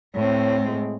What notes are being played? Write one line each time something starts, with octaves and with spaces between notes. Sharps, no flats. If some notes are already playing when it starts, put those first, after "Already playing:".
A2 C4 C#5
G#3